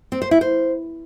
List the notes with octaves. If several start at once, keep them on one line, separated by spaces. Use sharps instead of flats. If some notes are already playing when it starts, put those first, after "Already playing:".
C4
C5
E4
C5